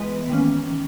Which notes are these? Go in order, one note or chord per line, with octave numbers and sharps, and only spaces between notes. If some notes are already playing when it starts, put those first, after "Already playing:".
Already playing: E3 G#3 B3 B4
D#3 A#3 C#4
D#3